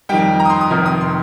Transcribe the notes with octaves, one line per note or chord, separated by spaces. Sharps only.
F2 D#3 G3 G5
A#5
D#6
C6
D#6
F1 F2 C3 D#3 F6
D#6
C6